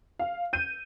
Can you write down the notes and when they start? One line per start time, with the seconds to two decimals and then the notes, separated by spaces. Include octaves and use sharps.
0.19 F5
0.53 G6 D#7